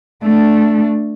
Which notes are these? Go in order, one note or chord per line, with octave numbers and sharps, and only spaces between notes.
A3 D4